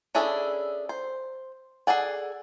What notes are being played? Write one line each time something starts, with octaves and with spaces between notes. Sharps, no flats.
C#4 D4 E4 G#4 A4
C5
G#4 A4 D5 F#5 G#5